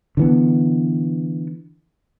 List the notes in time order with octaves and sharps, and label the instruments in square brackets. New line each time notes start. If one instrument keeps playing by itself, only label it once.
[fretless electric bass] D3 E3 B3